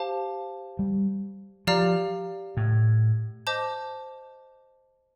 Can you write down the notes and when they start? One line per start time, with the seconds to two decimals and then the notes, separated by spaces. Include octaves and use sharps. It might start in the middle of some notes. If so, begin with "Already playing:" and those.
Already playing: G4 C5 F5 A5
0.79 G3
1.67 F3 G4 D5 F5 A#5 F6
2.57 A2
3.47 C5 D#5 A5 D6 G6